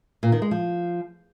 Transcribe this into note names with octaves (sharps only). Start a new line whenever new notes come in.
A#2
D#3
G#3
F3